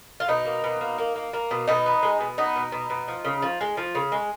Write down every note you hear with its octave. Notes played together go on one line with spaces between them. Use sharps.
F4
B2 D#4
A#3
B2
A#3
A#3
A#3
A#3
B2
B2 D#4
B3
G#3
B2
B3 D#4
B2
B2
B2
F3
C#3
F3
G#3
F3
C#3
G#3